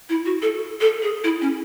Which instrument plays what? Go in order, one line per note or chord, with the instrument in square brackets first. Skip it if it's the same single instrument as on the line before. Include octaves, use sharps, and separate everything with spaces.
[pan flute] E4
F#4
A4
A4
G#4
E4
C#4